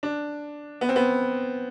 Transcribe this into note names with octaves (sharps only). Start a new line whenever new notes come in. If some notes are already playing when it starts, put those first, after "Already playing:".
D4
B3
C4
B3